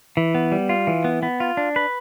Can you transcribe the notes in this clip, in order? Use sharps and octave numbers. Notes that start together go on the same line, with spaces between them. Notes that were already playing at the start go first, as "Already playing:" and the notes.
E3
B3
G3
F4
E3
B3
B3
F4
D4
B4